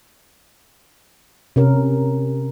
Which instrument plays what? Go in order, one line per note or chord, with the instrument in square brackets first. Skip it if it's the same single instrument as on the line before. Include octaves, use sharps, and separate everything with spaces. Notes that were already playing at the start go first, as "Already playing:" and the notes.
[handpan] C3 C#4 A#4